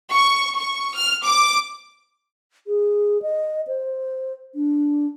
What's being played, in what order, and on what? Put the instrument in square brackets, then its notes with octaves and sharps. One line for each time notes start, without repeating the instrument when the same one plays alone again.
[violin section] C#6
C#6
F6
D6
[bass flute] G#4
D#5
C5
D4